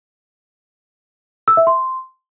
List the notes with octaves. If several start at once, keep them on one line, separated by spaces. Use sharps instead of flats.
E6
E5
C6